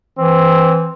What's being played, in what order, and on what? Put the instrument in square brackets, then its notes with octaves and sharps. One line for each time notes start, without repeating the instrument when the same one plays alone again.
[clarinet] E3 [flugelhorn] C4